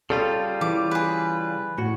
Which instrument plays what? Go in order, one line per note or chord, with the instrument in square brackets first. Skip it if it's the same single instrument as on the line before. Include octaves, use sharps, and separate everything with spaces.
[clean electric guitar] C#3 G3 F4 [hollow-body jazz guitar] A4
[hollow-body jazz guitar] E3 [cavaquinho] D6
[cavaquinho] G#4 B4
[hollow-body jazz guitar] A2 F#4